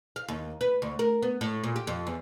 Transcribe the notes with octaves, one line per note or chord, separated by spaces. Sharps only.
F5
D#2
B4
D2
A#4
B3
A2
A#2
G4
F2
E2